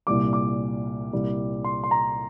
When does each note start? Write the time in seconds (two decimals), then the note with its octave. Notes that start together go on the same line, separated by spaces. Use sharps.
0.07 C2 A#2 G3 D6
0.33 D6
1.13 C2 A#2 G3 A#3
1.64 C6
1.84 C6
1.91 A#5